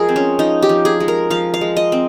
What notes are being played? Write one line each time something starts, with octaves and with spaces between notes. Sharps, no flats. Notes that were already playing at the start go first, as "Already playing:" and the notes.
Already playing: F3 G#3 G#4 A#4
C4
C#4
F3 D#4
G4
F3
G#4
G#3
A#4
F3 F5
F5
G#3
D#5
C4